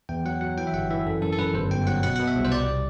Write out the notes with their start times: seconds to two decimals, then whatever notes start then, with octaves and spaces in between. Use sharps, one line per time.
0.09 E2 G5
0.25 F#3 F#5
0.41 F#3 F#5
0.58 E3 G5
0.67 E5
0.73 G1 F#5
0.90 E3 E5
1.07 F#2 A4
1.22 F#2 A4
1.33 A4
1.38 F#2 B4
1.54 G1 C5
1.71 G1 G5
1.87 F#3 F#5
2.03 B2 F#5
2.16 B2 F#5
2.28 E5
2.36 C2
2.45 C5
2.52 G3 D5